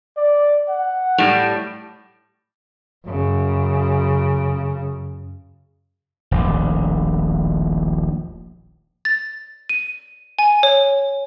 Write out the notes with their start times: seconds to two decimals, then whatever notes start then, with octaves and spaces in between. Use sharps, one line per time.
0.17 D5
0.69 F#5
1.18 A2 G3
3.06 F#2 C#3
6.31 D#1 A#1 A2
9.05 A6
9.69 D#7
10.39 G#5
10.63 C#5